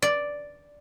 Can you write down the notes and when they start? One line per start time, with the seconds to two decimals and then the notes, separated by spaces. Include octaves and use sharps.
0.02 D5